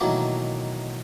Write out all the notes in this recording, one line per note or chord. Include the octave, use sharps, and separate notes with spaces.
B2 D#3 E3 F#3 A3 A#3